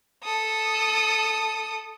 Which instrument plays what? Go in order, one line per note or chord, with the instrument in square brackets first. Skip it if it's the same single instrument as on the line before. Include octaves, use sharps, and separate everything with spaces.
[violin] A4 D#6